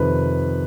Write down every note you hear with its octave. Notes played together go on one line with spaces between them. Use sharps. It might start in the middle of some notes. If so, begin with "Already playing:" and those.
Already playing: F2 C3 D#3 B4